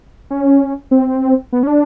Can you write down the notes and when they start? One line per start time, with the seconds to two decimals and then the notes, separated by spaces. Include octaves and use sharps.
0.30 C#4
0.91 C4
1.52 B3
1.63 C#4
1.67 D4